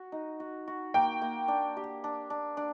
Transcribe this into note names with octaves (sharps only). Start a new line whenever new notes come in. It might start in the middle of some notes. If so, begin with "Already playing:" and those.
Already playing: F#4
D#4
F#4
F#4
A#3 G5
A#3
D4
G4
D4
D4
D4